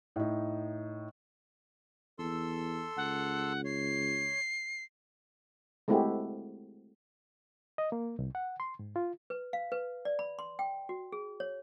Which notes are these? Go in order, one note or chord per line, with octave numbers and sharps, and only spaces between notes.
A2 D#4
E2 A4 C6 E6
C#2 F#5
C#5 C7
G#3 A3 C4 E4 F#4 G4
D#5
A#3
C2
F#5
C6
G#2
F4
B4
F5
B4
D5
B5
C6
G5
F#4
G#4
C#5